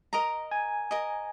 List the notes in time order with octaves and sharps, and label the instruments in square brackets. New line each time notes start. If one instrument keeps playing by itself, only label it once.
[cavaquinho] A#4 D#5 A#5
[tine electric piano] G#5
[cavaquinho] A#4 D#5 A#5